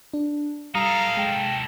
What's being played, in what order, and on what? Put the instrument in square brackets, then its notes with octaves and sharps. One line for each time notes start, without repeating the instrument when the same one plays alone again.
[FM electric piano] D4
[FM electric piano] G3 D#6 [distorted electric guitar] D#4 A4 [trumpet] F5 [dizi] A#5
[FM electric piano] G#3 [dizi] G5